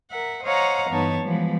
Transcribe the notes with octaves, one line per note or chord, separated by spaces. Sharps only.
A#4 E5 F#5
C5 C#5 D#5 F5 F#5 A#5
G2 E3 B3 D#4 C#5 A5
E3 F3 G3 G#3 B3